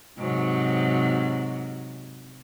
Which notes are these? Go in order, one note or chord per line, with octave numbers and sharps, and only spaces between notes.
G#2 C3 F#3